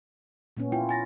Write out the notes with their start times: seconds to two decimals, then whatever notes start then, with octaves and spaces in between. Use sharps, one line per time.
0.57 A#2 B3 C#4
0.72 E4 F4 G5
0.89 G#5 A6 A#6